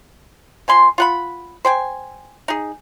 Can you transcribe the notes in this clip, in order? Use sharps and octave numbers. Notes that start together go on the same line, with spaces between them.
F3 G#5 C6
F4 F#5 B5
C5 G5 G#5
D#4 G#4